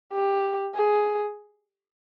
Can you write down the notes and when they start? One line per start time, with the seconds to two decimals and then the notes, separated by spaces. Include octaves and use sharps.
0.13 G4
0.75 G#4